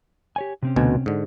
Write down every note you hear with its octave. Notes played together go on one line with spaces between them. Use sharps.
G4 C#5 G#5
C3 C4 C#4
D2 B2 G#5
G#2 D3